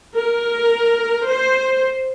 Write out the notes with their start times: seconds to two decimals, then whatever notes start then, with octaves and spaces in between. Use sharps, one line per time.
0.15 A#4
1.29 C5